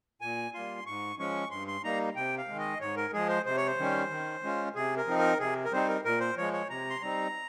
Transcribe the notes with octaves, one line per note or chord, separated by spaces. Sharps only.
A#2 G#5
G3 A#3 F4 C6
G#2 C#6
F3 G#3 C#4 C#6
G2 C6
C6
G3 A#3 D#4 A#5
C3 G5
F5
D#3 G#3
D#5
G#2 C#5
A#4
F3 G#3 G#4
C5
C3 C5
C#5
C5
D#3 G3 C#4
D#3
G#3 C#4 F4
C3 G#4
A#4
F3 C4 D#4
A#4
C3 G#4
A#4
G3 C4 D#4 C5
A#4
A#2 A#4
C5
F3 G#3 C#5
C#5
C3 A#5
C6
G3 C4 D#4 A#5